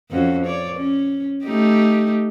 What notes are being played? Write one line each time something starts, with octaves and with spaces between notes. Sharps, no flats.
F2 C#4 F#4
C#5 D5
C#4
A3 D#4 G4